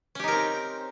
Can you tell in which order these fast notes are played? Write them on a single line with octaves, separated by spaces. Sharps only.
C#4 G4 D#4 A#4 C4